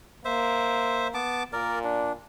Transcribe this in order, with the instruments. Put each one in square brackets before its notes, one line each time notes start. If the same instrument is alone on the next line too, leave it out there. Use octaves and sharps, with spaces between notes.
[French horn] A#3 [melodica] C5 E5
[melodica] B3 A5 D6
[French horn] A#2 [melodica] A#4 D5
[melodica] D4